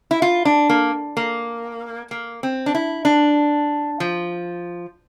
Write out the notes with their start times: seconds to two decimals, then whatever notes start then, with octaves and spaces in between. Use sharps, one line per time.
0.11 E4
0.22 F4
0.45 D4
0.69 A#3
1.17 A#3
2.11 A#3
2.43 C4
2.66 D4
2.75 E4
3.05 D4
4.00 F3